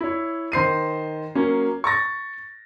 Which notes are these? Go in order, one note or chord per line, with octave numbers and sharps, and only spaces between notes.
E4 C#5
D#3 C5 C7 D#7
F#3 A#3 C#4
C#6 A6 A#6